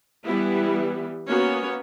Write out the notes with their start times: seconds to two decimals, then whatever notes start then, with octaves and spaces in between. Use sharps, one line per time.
0.25 E3 G3 B3 E4
1.27 A#3 B3 C#4 F#4 C#5